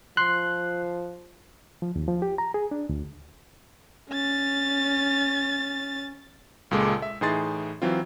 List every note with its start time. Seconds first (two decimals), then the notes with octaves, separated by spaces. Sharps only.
0.17 F3 C6 F#6
1.82 F3
1.96 D#2
2.08 F3
2.22 G4
2.38 A#5
2.54 G#4
2.71 D4
2.89 D2
4.10 C#4 A6
6.71 C#2 A#2 G#3 A4 D6
7.02 E5
7.21 A2 E3 D#4 G#4 C6 A6
7.82 E3 F#3 C4 F4